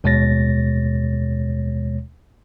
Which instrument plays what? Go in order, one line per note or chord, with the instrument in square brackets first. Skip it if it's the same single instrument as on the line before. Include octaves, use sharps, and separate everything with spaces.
[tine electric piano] D#2 B2 G#3 C#5 A6 A#6